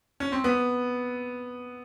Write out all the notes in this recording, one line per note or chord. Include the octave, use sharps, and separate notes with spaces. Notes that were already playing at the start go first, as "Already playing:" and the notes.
C#4
C4
B3